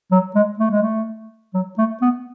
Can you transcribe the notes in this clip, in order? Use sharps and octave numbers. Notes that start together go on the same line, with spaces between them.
F#3
G#3
A3
G#3
A3
F#3
A3
B3